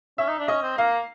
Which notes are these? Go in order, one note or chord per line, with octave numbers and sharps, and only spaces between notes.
C#4 E5
D#4
D4
C#4 D#5
C4
A#3 F5